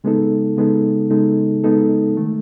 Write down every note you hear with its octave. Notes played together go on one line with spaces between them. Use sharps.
C#3 G#3 B3 D#4 A4
C#3 G#3 B3 D#4 A4
C#3 G#3 B3 D#4 A4
C#3 G#3 B3 D#4 A4
D#3 A3